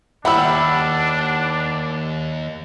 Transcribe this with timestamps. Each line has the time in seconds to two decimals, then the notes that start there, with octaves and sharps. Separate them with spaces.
0.25 D#2 G3 D4 E4 F#5 B5 E6